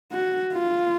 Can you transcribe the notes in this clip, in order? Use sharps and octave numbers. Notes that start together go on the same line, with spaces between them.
F#4
F4